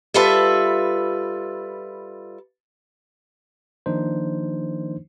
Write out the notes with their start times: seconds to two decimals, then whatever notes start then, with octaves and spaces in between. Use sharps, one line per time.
0.14 G3 F4 A4 B4 E5
3.86 D#3 F3 A#3 D4 D#4 C5